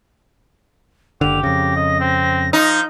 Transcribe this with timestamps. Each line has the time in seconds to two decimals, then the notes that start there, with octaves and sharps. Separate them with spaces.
1.21 F#1 D3 G4 F7
1.43 F2 C#3 A#6
1.76 D#5
2.00 C4
2.53 F3 D#4 G6